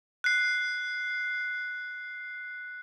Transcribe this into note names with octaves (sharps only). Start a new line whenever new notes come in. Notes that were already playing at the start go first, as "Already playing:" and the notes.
F#6 C7